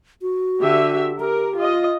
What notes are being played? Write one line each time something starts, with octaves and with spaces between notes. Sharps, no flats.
F#4
D3 G4 E5
G4 A#4
F4 D#5